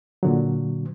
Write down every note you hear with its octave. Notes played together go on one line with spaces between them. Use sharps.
A#2 D3 F#3